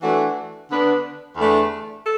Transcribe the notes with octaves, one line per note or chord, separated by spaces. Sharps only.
E3 A3 D4 F#4
D3 B3 D4 B4
E2 D3 A3 D4
A4